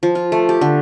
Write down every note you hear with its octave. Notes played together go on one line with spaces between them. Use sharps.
F3
F4
A3
G4
D3